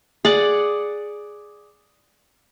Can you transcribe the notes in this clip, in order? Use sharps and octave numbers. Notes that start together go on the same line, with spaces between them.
G#4 D5 F#5